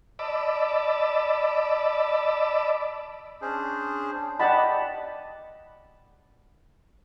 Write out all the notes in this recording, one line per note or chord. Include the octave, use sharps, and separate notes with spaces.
D5 D#5 A5 B5 D6 E6
C#4 D4 G#4 C5
D5 D#5 F#5 G5 A5 B5